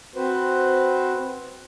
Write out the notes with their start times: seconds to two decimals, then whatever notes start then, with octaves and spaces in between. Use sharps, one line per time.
0.16 C4 F#4 B4 C5